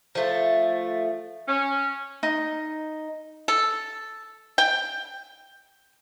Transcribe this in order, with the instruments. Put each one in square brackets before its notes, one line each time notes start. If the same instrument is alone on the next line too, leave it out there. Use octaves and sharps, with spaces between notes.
[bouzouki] F3 A3
[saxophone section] C#4
[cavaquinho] D#4
[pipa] A4
G5